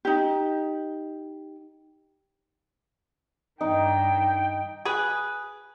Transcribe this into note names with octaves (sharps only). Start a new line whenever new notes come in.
D#4 G4
G2 D#3 D#4 G5
G#4 B4